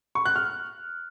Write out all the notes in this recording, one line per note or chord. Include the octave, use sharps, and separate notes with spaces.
C#6
F#6
F6